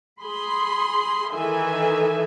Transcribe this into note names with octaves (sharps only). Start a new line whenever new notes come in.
G#4 B5 C6
D#3 E3 A4 E5 G#5